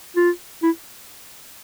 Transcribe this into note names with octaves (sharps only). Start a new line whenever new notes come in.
F4
E4